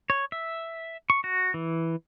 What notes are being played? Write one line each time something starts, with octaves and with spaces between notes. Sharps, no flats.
C#5
E5
C#6
F#4
E3